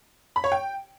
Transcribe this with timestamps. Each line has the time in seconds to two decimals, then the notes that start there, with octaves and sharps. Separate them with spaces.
0.36 B5
0.44 C#5
0.52 G5